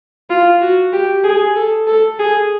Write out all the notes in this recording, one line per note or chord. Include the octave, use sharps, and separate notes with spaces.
F4
F#4
G4
G#4
A4
A4
G#4